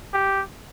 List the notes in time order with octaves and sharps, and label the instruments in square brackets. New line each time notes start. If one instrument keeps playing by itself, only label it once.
[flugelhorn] G4